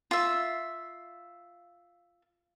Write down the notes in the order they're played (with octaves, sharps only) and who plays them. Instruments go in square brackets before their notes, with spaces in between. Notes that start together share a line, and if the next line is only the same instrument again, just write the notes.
[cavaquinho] F4 E5